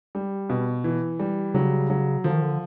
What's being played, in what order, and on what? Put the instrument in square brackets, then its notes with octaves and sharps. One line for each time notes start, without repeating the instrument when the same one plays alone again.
[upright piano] G3
B2
E3
G3
[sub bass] C#3 [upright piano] F#3
[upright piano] F#3
[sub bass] D3 [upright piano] F3
[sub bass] D#3
D3